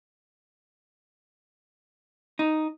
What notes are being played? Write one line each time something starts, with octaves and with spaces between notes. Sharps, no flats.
D#4